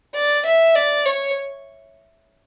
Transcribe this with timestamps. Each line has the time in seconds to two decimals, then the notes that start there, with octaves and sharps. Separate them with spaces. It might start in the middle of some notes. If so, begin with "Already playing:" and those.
0.15 D5
0.46 E5
0.75 D5
1.06 C#5